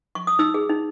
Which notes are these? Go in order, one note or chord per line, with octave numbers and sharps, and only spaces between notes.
C#6
D#6
D#4 E6
G#4
D#4